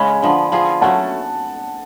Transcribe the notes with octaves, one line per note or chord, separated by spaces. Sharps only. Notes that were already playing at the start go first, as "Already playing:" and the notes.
Already playing: C#3 G#3 C#4 G#5 B5
D3 F3 B3
F3 B3 F4 G#4
F#3 A3 C#4 F#5 A5